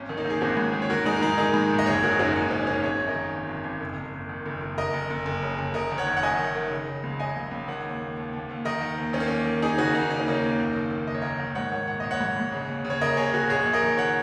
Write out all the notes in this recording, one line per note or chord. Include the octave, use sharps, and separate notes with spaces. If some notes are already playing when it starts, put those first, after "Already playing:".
Already playing: G#1 C#4
D#3
A#3 D#4
D#3 G#4
G#1 C#4 F#4
G#2
D#3
C#5
D#3 F#4 A#4
A#4
G#2 D#4 G#4
A#4
G#2 D#4 G#4
D#3 D#4 G#4
G#2
A#1
D#5
F#1 G#4 C#5
F#1 F#4 A#4
D#4
F#2 C#4 F#4
F#1 A#3 D#4
F#2 C#4
D#4
F#2 C#4
G#1 G#4 C#5
G#1
A#4 D#5
D#3
G#1
G#1
G#1
F#1
F#1
F#1
D#3
F#1
F#1
F#1 A#4 D#5
F#1
F#1
F#1
C#3
F#1
F#1 A#4 D#5
D#3
C#5 F#5
F#1
F#5
F#2 D#5 G#5
D#3
D#3
C#3
C#3
C#2
C#3 D#5 G#5
C#2
C#2
D#3 C#5 F#5
D#2
D#2
D#2
D#2
D#2
D#3 A#4 D#5
D#3
D#2
D#3 C#4
A#3
D#2 C#4
D#3
D#2 D#4 G#4
C#3 C#4 F#4
C#3 A#3 D#4
D#2 D#4
C#4
C#3 A#3 D#4
D#2
F#1
D#3
D#3
F#1 D#5
C#5
F#1 A#4 D#5
D#3
G#2 C#5 F#5
D#3 C#5 F#5
A#1 F#5
A#1 D#5
C#5 F#5
G#2
G#2
C#3
D#2
C#3
C#5
C#3 A#4 D#5
D#2 G#4 C#5
C#3 F#4 A#4
A#1 G#4 C#5
A#1
A#4 D#5
D#3
C#5 F#5